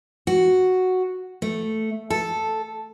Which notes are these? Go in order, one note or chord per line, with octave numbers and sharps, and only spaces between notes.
F#4
A3
A4